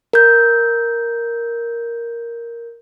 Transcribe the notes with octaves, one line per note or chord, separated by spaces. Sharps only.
A#4 G6